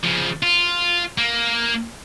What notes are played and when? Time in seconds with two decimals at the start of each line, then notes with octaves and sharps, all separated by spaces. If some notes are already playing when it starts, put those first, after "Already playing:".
0.03 C#3 F3
0.43 F4
1.18 A#3